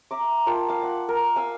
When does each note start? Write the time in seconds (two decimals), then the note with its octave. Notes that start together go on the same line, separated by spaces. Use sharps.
0.11 E5 A#5 D6
0.46 F4 A#4 G5 A5
0.68 F5 D6
0.83 F#5
1.09 A#4
1.36 F5 G#5 E6